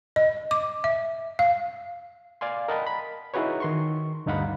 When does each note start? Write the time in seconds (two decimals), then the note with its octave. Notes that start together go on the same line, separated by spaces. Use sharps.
0.16 D#5
0.51 D6
0.84 E5
1.39 F5
2.41 D5 F5 G#5 C6
2.68 A#4 D#5 F#5 G5 A5 B5
2.87 B5
3.34 D#4 E4 F#4 G#4 B4 C#5
3.60 D#3 C6 C#6
4.26 D2 G2 D#4 F5 F#5 B5